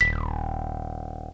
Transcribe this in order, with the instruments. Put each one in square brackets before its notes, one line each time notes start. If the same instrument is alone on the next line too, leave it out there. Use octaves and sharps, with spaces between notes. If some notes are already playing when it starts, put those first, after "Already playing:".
[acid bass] D#1 [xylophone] B6